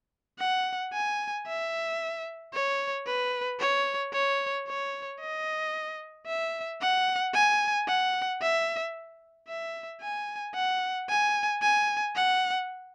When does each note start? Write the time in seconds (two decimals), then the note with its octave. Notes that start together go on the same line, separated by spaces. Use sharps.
0.39 F#5
0.93 G#5
1.47 E5
2.53 C#5
3.06 B4
3.59 C#5
4.13 C#5
4.67 C#5
5.20 D#5
6.27 E5
6.81 F#5
7.34 G#5
7.87 F#5
8.42 E5
9.48 E5
10.01 G#5
10.55 F#5
11.09 G#5
11.62 G#5
12.16 F#5